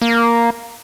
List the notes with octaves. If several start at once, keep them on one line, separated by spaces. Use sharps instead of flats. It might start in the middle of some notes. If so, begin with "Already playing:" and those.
A#3